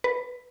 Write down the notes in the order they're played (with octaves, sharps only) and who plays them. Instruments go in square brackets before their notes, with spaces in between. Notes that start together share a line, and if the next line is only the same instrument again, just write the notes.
[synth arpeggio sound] B4